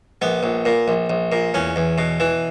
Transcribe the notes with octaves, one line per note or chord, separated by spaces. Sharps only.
A#1 B3
A#1
A#2
A#1
A#1
A#2
E2 C#4
E2
B2
E3